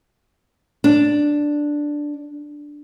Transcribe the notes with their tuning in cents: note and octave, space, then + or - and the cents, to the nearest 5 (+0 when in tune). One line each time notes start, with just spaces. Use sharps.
D4 +0